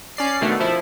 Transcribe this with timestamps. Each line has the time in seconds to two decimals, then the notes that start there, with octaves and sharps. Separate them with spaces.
0.17 C#4 D5 C7
0.41 B2 D3 D#3 A3
0.60 F3 E4